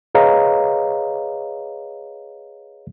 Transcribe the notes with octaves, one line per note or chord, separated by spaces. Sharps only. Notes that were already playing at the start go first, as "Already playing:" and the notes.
G#4 B4 C#5 D#5 F5 A#5